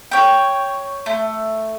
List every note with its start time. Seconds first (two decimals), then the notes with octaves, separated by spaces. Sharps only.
0.11 C#5 G5
1.06 A3